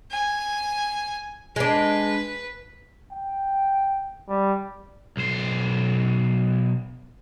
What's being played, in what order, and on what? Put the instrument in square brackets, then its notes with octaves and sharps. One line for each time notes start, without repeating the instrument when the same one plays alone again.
[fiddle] G#5
[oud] G#3 D4 [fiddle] B4
[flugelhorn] G5
G3
[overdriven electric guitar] B1 C5